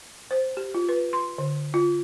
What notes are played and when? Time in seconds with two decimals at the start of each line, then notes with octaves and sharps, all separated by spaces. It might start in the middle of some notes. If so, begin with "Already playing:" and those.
0.31 C5
0.57 G4
0.75 F4
0.89 B4
1.13 C6
1.38 D3
1.74 F4